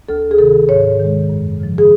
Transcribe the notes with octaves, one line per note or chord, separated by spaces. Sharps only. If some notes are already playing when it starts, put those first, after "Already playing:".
D2 A4
G#4
C3 D#3 A4
G#2 C#5
D#3 G#3
F#2
C#3 F3
G#4